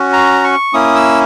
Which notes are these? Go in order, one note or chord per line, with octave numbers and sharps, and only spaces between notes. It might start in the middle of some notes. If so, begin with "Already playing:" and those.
Already playing: C#4 F#4
A#5
C#6
A#3 C#4 E4 D#6
E6